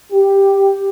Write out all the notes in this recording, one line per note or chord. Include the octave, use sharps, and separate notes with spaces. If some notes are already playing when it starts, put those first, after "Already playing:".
G4